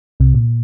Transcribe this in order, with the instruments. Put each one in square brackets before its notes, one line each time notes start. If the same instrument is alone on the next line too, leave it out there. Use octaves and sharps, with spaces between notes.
[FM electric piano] C2 C3
A#2